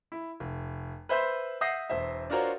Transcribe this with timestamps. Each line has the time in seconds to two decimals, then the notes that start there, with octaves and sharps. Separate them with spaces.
0.12 E4
0.40 F1
1.09 B4 C5 E5 C6 G6
1.61 E5 F#5 D#6 G6 A#6 C7
1.90 E1 C5 E5
2.30 D4 F4 F#4 A#4 C5 C#5